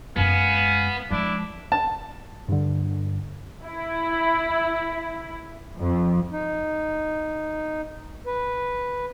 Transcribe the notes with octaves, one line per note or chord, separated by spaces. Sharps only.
F#2 G#3 B3 F5 G#5
F3 G#3 D4 E4
A5
G2 D3
E4
F2
D#4
B4